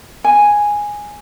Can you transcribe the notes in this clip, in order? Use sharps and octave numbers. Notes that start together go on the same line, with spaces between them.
G#5